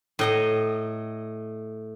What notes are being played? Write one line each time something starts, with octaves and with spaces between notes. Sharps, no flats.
A2 D#5 A#5